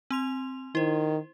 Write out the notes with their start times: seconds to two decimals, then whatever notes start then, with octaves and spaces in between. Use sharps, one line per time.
0.11 C4 C6 F7
0.75 D#3 E4 C5